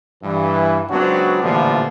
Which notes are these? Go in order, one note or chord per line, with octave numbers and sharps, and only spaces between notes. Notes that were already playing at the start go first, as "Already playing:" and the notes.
G2 E3
C#2 F#3 B3 C4 D4 F#4
A1 A#2 D3 E3 F3 G3